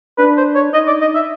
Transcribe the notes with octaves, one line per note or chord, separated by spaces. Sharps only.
D4 B4
C5
C#5
D#4 D#5
D5
D#5
E5